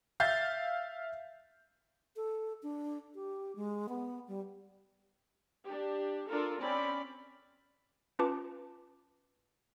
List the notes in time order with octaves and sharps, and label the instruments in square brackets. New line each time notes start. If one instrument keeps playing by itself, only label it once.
[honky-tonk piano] E5 F5 G6 A6 C7
[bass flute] A4
D4
G4
G#3
B3
G3
[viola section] D4 G4
D4 F4 A4 A#4
C4 C#4 D5 B5
[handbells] C#4 F4 B4 A5 D6